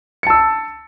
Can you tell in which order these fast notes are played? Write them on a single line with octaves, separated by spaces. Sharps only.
C#7 A5 E6